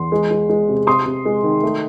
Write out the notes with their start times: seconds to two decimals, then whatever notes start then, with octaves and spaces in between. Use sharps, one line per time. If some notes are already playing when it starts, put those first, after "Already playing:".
Already playing: E2 C6
0.12 G#3
0.31 G#3
0.50 G#3
0.69 C3
0.87 C3 C6 D#6
1.06 C3
1.25 G#3
1.43 D#3
1.63 A3